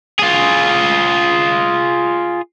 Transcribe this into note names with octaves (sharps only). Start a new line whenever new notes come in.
F4 G#4